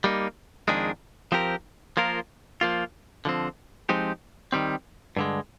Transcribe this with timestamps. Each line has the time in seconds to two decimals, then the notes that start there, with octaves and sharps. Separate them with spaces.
0.04 G3 A#3 D#4
0.68 F2 D#3 G#3 D4 G#4
1.32 F3 C4 G4 A#4
1.97 F3 A#3 F4 A#4
2.61 F3 A#3 F4
3.25 D3 F3 C4
3.89 F3 G#3 C4 D#4 G4
4.52 D#3 G3 C4
5.16 G2 D3 G#3